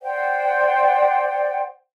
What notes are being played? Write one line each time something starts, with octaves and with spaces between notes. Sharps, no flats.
C5 D5 F#5 G5